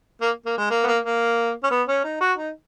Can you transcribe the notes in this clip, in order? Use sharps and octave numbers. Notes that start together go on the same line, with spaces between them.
A#3
A#3
G#3
A#3
B3
A#3
A#3
C#4
B3
C#4
D#4
F#4
D#4